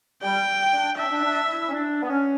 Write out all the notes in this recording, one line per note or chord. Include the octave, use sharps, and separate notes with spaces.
G3 G5
D4
D4 E5
C#4
D4
D4
E4
C#4
D4
B3
C#4